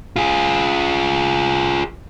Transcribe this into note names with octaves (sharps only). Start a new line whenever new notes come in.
F4 G#4